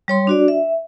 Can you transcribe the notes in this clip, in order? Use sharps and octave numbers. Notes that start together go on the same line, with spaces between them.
G3 C#5 C6
D4 F#4 D5
E5